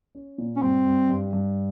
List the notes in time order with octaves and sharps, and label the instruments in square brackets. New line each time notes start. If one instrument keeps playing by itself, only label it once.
[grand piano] C#4
A#2
[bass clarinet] C#4
[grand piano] G2 [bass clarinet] C4
[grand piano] G2
G2
G2